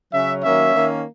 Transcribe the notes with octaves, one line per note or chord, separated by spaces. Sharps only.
C#3 F#3 C#4 E5
D#3 F#3 A#3 C#4 E5
D#3 A#3 C#4